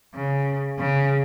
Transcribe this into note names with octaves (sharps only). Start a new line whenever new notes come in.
C#3
C#3